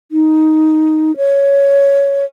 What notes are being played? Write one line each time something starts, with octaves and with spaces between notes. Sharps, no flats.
D#4
C#5